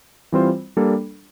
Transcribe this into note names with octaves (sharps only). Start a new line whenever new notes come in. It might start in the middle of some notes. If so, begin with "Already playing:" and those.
E3 G3 C4 F4 C5
G3 A#3 D4 A4